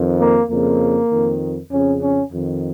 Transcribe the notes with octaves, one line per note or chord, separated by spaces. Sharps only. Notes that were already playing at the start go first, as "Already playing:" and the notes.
Already playing: F2 D#3
A#3
F2 C#3 A#3
F2 D#3
F2 C#3 C#4
C#4
F2 D#3